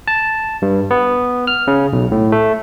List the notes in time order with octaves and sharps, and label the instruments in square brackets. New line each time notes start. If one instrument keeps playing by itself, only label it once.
[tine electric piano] A5
G2
B3
F6
C#3
B1
A2
A3